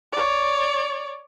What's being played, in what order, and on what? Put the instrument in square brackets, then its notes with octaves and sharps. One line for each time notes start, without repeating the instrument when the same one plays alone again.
[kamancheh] C#5 D5